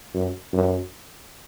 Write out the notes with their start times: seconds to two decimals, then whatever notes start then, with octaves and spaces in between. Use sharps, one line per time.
0.14 F#2
0.53 F#2